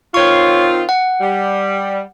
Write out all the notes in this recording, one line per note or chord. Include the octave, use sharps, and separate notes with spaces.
D#3 C4 F4 C#5 C#6
F#5
G3